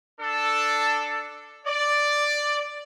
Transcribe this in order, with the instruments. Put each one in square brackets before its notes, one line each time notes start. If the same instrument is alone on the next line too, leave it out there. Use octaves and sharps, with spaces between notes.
[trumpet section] D4 A4
D5